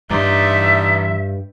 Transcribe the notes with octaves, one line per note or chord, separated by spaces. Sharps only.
G2 E3 D#4 D5 E5 C6